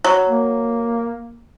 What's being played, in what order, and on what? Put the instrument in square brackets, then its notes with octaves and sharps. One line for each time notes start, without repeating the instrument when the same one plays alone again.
[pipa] F#3
[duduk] A#3